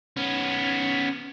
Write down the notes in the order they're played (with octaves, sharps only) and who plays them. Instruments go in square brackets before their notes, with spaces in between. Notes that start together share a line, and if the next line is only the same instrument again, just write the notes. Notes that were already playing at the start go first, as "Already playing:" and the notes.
[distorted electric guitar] B3 C#4